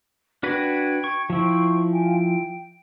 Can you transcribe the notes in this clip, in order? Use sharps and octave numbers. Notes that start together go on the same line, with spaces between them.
D4 F#4 B4 G5 G#6
C#6
F3 E4 C5 G5 C#6
F4 G5 G#5
G5